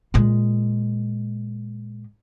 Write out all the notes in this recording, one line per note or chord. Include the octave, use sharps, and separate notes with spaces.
A#2 G#3